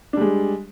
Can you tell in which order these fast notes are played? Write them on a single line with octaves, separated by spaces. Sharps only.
D4 G3 G#3